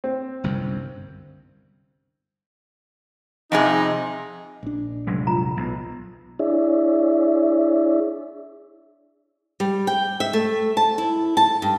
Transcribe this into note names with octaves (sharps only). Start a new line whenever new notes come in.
C4
G1 C2 F#2
F2 C3 D#4 G#4
A#1 D4
F1 F#3 G#3
F4 A#5
B1
D4 E4 G#4 C#5 D5 E5
G3
G5
E5
A3
A5
E4
A5
G2